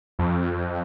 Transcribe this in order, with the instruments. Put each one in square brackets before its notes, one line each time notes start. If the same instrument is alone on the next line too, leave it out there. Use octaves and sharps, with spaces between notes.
[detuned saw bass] F2